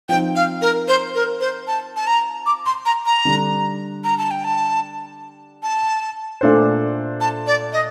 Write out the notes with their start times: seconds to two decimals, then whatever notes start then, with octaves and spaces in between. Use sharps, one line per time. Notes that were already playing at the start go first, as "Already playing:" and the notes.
0.09 F3 C4 D#4 G5
0.36 F5
0.62 A#4
0.88 C5
1.15 A#4
1.41 C5
1.67 A5
1.96 A5
2.07 A#5
2.46 D6
2.66 C6
2.86 A#5
3.06 A#5
3.25 D3 G3 D4
4.04 A#5
4.18 A5
4.31 G5
4.44 A5
5.63 A5
6.41 A#2 A3 D4 A4 C5
7.21 A5
7.47 D5
7.73 D#5